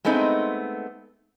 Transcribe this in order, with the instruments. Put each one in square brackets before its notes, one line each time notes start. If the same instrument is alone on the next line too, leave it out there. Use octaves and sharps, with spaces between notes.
[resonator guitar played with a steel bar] G#3 A3 B3 C4 D#4